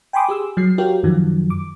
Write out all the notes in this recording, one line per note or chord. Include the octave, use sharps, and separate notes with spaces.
G5 G#5 B5 C6 D6 D#6
G4 G#4 E6
F#3 C7
F#4 G4 A#4 C#5 F5 G5
F#2 D#3 F3 F#3
D6